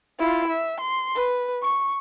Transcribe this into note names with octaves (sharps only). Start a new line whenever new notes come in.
E4 F4
E5
C6
B4
C#6